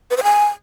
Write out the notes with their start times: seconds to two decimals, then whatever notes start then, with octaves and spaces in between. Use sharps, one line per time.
0.11 B4
0.17 C5
0.23 G#5